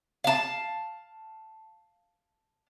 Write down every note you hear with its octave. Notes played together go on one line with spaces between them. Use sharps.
F5 A5